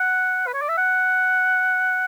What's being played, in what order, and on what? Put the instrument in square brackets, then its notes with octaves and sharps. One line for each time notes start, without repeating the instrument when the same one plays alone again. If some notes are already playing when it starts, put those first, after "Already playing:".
Already playing: [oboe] F#5
B4
C#5
D5
E5
F#5